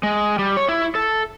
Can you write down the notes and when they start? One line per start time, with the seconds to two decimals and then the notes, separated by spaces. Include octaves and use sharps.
0.03 G#3
0.39 G3
0.57 C#5
0.69 E4
0.95 A4